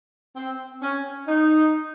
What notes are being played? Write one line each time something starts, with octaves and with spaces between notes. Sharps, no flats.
C4
C#4
D#4